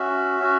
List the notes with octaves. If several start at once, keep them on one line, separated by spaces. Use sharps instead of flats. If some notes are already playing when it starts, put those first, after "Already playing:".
Already playing: C#4 F#4 E5
C#4 F#4